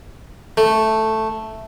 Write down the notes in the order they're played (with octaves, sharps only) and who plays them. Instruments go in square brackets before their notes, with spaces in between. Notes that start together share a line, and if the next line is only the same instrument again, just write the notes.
[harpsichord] A3